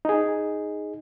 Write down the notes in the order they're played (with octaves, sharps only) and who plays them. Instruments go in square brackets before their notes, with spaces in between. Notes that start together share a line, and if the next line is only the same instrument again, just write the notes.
[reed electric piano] D#4 G#4